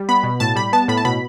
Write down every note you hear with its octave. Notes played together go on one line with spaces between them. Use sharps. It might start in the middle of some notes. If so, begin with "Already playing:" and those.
Already playing: G3
B3 B5
B2
A2 A5
G3 B5
B3 A5
A2 B5
A5
B2 B5